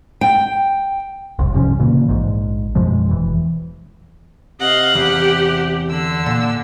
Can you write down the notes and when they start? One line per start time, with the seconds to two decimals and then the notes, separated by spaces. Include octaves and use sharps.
0.21 G5
1.39 E1 C2
1.54 G2 C3 F3 C#4
1.79 A#2 C#3 E3 A#3
2.09 A#1 G#2
2.75 F#2 B2 F3 G#3
3.09 E1 E3
4.60 C3 D#5 F5 F#5
4.95 E2 G4
5.90 D3 E6
6.26 A#2